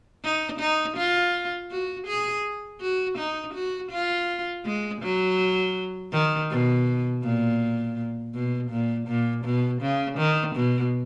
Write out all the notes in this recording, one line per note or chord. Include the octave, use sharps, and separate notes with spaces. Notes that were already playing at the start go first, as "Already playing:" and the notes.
D#4
D#4
F4
F#4
G#4
F#4
D#4
F#4
F4
G#3
F#3
D#3
B2
A#2
B2
A#2
A#2
B2
C#3
D#3
B2